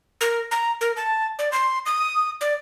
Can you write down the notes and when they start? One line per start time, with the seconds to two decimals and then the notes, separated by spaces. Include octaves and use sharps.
0.21 A#4
0.51 A#5
0.81 A#4
0.96 A5
1.39 D5
1.52 C6
1.86 D#6
2.41 D5